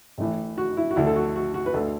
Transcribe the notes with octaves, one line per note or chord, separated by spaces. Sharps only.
A1 A2 E3
F#4
E4
F#4
D2 D3 E4
A4
F#4
F#4
F#4
B4
D2 D3 A4